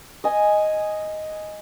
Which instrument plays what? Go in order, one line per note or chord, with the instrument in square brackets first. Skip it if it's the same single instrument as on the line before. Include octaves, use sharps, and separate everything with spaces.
[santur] D#5 G#5